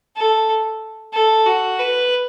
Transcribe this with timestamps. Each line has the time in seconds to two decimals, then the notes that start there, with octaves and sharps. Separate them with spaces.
0.16 A4
1.13 A4
1.46 F#4
1.79 B4